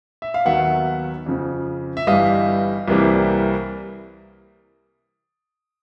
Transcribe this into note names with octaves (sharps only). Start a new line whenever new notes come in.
E5
F5
D#2 D#3 F#3 B3 E5 F#5
F2 C#3 F3
E5
G1 G2 E3 G3 D#5 F5
C2 C3 E3 G3 A#3